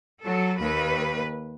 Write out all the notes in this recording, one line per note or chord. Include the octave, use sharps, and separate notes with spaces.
F#3 A4
D#2 B4